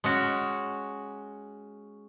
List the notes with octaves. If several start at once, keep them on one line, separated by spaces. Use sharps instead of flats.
G#3 C#4 F#4